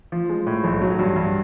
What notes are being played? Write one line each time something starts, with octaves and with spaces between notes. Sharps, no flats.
F3
G#3
A2
B1
F#3
G2
G2